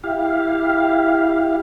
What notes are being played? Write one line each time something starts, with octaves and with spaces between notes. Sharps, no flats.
E4 G4 F5